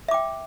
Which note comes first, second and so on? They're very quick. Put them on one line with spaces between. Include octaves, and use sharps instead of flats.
E5 D6 G5